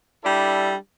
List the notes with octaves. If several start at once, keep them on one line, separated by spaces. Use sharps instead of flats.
G3 D4 E4 A4